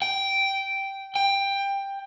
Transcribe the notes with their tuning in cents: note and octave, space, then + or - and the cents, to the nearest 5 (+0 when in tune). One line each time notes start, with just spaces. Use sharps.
G5 -5
G5 +15